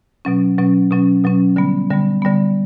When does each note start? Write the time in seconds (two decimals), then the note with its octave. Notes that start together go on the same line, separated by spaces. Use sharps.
0.25 B2 F#3 C#4
0.58 B2 F#3 C#4
0.91 B2 F#3 C#4
1.24 B2 F#3 C#4
1.56 D3 G3 B3
1.90 D3 G3 B3
2.22 D3 G3 B3